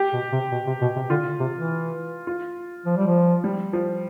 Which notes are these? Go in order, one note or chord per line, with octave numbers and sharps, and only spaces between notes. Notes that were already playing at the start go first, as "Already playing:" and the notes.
Already playing: G4
B2
C3
B2
C3
B2
C3
D3 F4
C3
E3
F4
F3
G3
F3
G3
F3